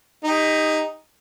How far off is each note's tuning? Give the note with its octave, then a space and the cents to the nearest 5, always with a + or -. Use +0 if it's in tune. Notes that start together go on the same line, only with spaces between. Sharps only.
D#4 +0 G4 +30